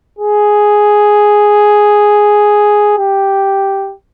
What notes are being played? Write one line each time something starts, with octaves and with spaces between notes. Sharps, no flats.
G#4
G4